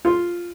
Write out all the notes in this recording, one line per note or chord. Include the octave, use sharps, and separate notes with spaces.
F4